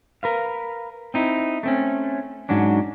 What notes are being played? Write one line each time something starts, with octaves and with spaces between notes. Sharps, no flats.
A#4 B4 F5
C4 D#4 E4
A3 C4 C#4
G#2 F#3 C#4 D4